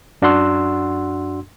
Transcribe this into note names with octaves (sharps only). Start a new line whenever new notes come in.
F#2 D4 F#4 F#5 C6 E6